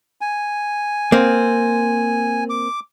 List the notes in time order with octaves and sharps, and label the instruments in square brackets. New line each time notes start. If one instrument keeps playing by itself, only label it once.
[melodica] G#5
[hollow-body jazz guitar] A#3 C4
[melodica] D6